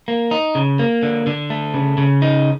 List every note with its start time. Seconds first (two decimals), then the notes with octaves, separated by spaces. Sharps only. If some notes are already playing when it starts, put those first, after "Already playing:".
0.08 A#3
0.31 D#4
0.55 C#3
0.79 A#3
1.03 D3
1.27 D3
1.50 A3
1.74 C#3
1.98 C#3
2.22 D#4